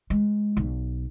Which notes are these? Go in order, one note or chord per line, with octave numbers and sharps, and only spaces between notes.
G#3
B1